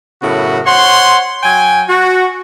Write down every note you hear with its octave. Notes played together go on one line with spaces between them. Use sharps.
F#2 A2 C#3 B3 F#4
C5 C#5 F#5 C6
F#3 G5 G#5
F#4